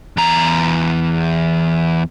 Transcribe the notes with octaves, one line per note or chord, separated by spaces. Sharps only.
E2 A#5